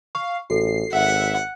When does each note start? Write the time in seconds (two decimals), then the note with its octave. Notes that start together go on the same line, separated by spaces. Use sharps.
0.15 F5 C#6
0.50 A1 F#4 A4 C7
0.93 G#1 E5 F#5